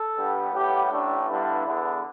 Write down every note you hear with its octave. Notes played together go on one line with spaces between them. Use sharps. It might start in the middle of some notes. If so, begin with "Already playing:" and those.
Already playing: A4
G2 G3 B3
A2 G3 B3 G4
A1 A2 A3 D4
G2 D3 G3 B3 E4
E2 D3 B3